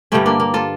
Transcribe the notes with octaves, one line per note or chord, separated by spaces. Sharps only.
G2 D3 G3 A3 C#4
A#3 D4
A#3
F4 A4